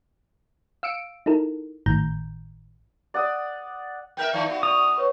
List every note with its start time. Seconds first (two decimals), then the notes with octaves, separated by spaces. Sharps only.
0.83 F5 E6 C#7 D7
1.26 D#4 E4 A4 A#4
1.86 G#1 A2 D#3 A#5 G6
3.14 D5 F#5 D#6
4.17 B3 A#4 E5 G5 G6
4.33 D#3 E3 D#4 D5 F5
4.46 B3 F#4
4.63 D5 D#6 F7
4.98 B4 C#5 C#6